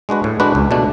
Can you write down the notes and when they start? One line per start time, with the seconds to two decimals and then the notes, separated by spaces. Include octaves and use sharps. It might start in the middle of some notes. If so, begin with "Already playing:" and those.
0.09 G#3 D4 F#4 B4
0.24 A2
0.40 G#3 D4 F#4 B4
0.55 C#2
0.71 B2 A3 D4